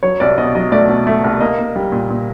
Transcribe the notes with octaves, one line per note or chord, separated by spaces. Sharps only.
F#3 C#5
C2 D5
B2 D#5
F#3 D#5
A3 D5
B2
A3
C2
A#3 D#5
A#3
G3
A#2
A#2